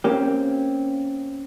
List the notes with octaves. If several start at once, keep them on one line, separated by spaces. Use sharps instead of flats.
A#3 C4 C#4 G4